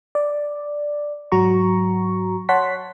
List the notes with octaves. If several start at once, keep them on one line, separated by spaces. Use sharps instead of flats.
D5
G#2 F#3 F#4 A#5 C#6
C#5 F#5 A5 C6 B6